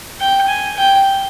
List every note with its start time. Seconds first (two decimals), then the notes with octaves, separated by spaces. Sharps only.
0.20 G5
0.48 G#5
0.77 G5